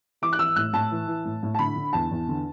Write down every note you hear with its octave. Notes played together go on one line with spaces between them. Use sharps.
E3 D6
F#6
E3 E6
A2 F#6
A2 A5
E3
E3
A2
A2
A5
D3 B5
D3
E2 A5
E2
D3